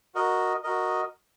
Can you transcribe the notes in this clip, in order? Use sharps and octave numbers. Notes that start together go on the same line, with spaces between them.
F#4 A#4 D#5
F#4 A#4 D#5